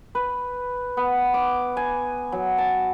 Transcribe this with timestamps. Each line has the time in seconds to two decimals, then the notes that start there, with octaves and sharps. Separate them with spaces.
0.15 B4
0.97 B3
1.34 D6
1.77 G#5
2.32 F#3
2.58 A5